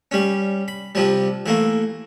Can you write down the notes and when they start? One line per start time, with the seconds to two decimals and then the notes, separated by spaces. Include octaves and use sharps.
0.11 G3 C#4
0.68 B5
0.95 C3 F3 G3
1.46 E3 A3 A#3